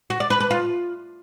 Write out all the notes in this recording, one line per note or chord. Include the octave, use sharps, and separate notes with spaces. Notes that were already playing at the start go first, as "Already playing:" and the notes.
F#4
D5
B4
B4
F4